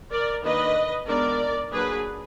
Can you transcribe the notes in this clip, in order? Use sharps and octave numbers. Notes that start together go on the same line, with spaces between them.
A#4 D5
D#3 A#3 D4 B4 D#5
D#3 G#3 B3 D4 A#4 D5
F#3 A#3 D4 G#4 B4